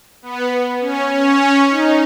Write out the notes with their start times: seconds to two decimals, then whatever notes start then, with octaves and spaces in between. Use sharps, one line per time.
0.22 B3
0.81 C#4
1.11 C#4
1.70 D#4